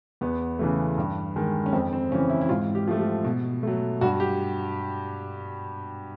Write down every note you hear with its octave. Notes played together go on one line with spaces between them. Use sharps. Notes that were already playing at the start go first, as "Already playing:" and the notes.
E2 B3
C#3 E3 A3
G2
D#3 G#3
C#4
F2 C4
C4
C#3 E3 C#4
E4
E4
G#2 F4
G4
F3 A3
G4
B2
F#3 A3
G2 F#4
G4